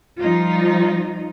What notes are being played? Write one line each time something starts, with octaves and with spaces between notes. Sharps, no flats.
F3 G3 D#4 F4